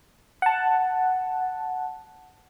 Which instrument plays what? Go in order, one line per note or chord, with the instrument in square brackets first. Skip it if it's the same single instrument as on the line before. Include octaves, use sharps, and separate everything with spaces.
[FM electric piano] F#5 A5